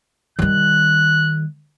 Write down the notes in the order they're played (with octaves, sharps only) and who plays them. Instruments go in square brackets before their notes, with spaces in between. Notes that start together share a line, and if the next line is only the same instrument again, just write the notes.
[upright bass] D#3 G3 [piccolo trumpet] F#6